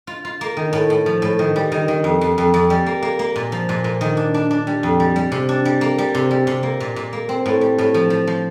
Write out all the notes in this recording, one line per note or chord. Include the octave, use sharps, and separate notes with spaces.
F4
F4
A#3
D#3
A2
A2
F3
A2
D#3
G3
D#3
D#3
F2
F2
F2
F2
G3
A#3
A#3
A#3
A#2
F3
A#2
A#2
D#3
D4
D4
D4
G3
F2
G3
G3
C3
D4
G3
A#3
G3
C3
G3
C3
A#3
A#2
A#2
A#3
C4
A2
G3
A2
F3
F3
F3